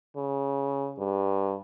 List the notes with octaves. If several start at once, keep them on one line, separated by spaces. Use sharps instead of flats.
C#3
G2